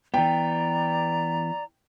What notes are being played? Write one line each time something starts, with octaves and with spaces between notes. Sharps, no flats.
E3 B3 D5 G5 A#5